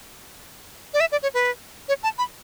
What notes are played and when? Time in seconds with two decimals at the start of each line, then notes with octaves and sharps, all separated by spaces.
0.94 D5
1.00 E5
1.12 D5
1.23 C#5
1.34 B4
1.89 C#5
2.03 A5
2.18 B5